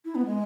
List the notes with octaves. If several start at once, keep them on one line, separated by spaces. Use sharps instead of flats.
E4
B3
G#3